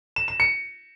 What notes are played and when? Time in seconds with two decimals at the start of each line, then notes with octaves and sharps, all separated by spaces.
0.16 E7
0.28 E7
0.40 C#7